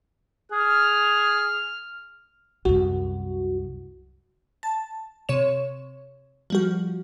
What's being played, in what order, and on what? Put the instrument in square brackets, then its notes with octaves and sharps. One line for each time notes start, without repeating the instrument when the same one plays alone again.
[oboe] G#4 [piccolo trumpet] F6
[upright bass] C2 F#2 [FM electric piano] F#4
[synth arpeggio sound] A5
C3 C#5 E7
F3 G3 F#4